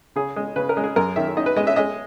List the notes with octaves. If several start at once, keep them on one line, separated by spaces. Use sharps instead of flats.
C#3 G#4
G#3
C#3 B4
A#4
G#3
G#4
F#2 A#4
D#3 E5
D#4 D#5
B4
G#3 D#5
E5
G#3 D#5